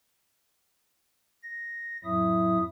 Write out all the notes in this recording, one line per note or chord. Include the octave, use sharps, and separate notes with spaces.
A#6
F2 A2 F#3 E4 E5 D#6